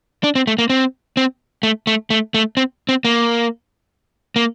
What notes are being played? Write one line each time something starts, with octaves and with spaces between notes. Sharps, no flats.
D4
C4
A3
A#3
C4
C4
A3
A3
A3
A3
C4
C4
A#3
A#3